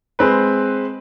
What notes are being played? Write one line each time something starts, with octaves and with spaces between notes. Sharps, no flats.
G#3 C4 B4